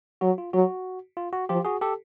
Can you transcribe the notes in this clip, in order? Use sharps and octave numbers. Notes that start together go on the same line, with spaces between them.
F#3 F#4
F4
F#3 F#4
F4
F#4
F3 F4 G4
F#4 G#4
G4 A4